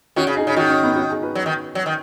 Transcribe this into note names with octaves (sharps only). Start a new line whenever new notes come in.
D#3 C#4 F#4
C#3
D#4 G#4
C#3
D#3 C#4 F#4
C#4
B3 D#4
C#4 F#4
D#4 G#4
F#4 B4
F#3
D#3
F#3
D#3